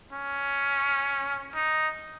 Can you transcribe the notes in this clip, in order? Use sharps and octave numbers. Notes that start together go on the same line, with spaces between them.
C#4
D#4